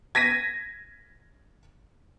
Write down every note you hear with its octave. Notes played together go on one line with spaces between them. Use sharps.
G#6 A#6 B6 D#7